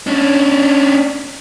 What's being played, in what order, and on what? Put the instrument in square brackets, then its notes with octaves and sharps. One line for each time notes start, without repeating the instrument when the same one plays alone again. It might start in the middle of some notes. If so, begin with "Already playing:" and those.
[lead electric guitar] C#4 D4